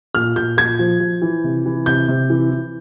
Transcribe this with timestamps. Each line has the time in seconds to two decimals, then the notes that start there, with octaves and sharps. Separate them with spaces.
0.15 A#2 F6
0.36 A#2 G6
0.57 A#2 G#6
0.79 F3
1.00 F3
1.22 E3
1.44 C3
1.66 E3
1.86 C3 G6
2.08 C3
2.30 E3
2.51 E3